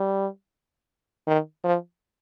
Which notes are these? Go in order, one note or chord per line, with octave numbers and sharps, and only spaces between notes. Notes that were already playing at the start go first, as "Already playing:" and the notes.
Already playing: G3
D#3
F3